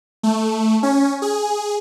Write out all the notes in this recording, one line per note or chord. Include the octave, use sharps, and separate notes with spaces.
A3
C#4
G#4